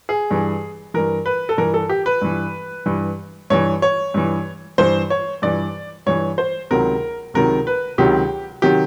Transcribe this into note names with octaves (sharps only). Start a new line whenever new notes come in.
G#4
G2 E3
G2 E3 A#4
B4
A4
G2 E3 A#4
A4
G4
B4
G2 E3
G2 E3
G2 E3 C#5
C#5
G2 E3
G2 E3 C5
C#5
G2 E3 D5
G2 E3 C#5
C5
C#2 C3 D#3 F#3 A#4
C#2 C3 D#3 F#3 A#4
B4
C#2 C3 D#3 F#3 G4
C3 D#3 F#3 G4